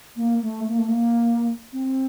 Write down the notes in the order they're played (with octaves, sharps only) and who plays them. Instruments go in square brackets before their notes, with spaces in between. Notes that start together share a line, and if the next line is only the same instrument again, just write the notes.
[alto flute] A#3
A3
A#3
A3
A#3
C4